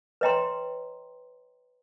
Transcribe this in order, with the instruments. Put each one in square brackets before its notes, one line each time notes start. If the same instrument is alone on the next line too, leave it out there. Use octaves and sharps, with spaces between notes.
[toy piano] B4 C#5 D#5 G5 A#5 C6